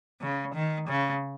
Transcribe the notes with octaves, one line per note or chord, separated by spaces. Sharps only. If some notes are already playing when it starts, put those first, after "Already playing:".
C#3
D#3
C#3